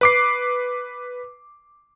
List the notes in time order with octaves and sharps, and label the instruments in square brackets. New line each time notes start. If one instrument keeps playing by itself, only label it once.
[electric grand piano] B4 D6 C7